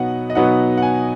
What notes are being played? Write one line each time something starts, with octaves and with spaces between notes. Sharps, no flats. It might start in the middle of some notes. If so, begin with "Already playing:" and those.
Already playing: B2 F#3 B3 D#4 F#5
D#5
B2 F#3 B3 D#4 F#5
F#5
G#5